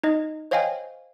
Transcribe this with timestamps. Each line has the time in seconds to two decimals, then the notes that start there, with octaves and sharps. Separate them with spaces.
0.04 D#4 D#5
0.51 C5 C#5 D#5 F5 G5 G#5